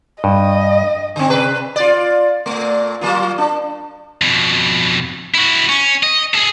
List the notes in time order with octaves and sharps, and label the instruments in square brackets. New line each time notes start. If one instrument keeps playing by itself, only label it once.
[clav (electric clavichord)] G2 [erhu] D#5
[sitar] D3 C4
C3 B4
F4 D5
A#2 A3
F#3 A#3 F4
D4
[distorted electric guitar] F2 B2
E4 F#4
C#4
D#5
G#4 A4